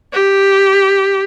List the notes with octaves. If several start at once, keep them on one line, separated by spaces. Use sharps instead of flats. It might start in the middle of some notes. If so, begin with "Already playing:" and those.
G4